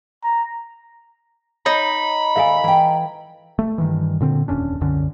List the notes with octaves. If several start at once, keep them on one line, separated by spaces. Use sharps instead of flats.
A#5
D#4 C#5 B5
D#2 A4 D5 E5 F5 G#5
E3 G5
A3
G2 D#3 E3
A#2 D3 C4
D#1 F2 C#4 D4
C2 F#2 D3 C#4